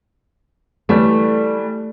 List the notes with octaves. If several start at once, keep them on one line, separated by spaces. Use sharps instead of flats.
E3 G3 A3